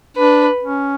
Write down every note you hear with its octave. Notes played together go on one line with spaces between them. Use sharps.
D4 B4
C#4